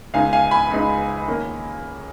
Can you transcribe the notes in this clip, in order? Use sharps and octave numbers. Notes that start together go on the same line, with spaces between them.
C#2 C#3 G#3 D#4 F5 G#5
F5 G#5
G#5 B5
C#2 C#3 G#3 D#4
D#3 A#3 C#4